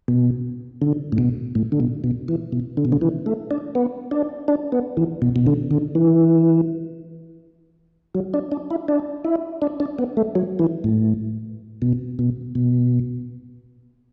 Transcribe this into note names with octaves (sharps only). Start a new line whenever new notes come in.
B2
D3
A2
B2
A2
D3
B2
B2
E3
B2
D3
B2
D3
E3
A3
D4
B3
D4
D4
B3
E3
B2
B2
D3
D3
E3
F#3
D4
D4
E4
D4
E4
D4
D4
B3
A3
F#3
E3
A2
B2
B2
B2